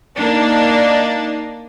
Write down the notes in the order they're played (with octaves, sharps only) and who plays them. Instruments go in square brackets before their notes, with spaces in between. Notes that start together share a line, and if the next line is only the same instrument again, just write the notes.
[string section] A#3 D4 D#4